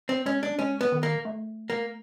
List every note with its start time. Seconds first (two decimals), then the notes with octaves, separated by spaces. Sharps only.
0.09 C4
0.26 G#3 C#4
0.43 D4
0.59 G#3 C#4
0.81 B3
0.92 D#3
1.03 A#3
1.25 A3
1.70 A#3